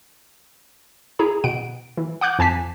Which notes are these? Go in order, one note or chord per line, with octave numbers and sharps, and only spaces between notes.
E4 G#4 A#5
B2 F#5 D7
E3
F#5 D6 F#6 G6
F2 G#5 A5 B6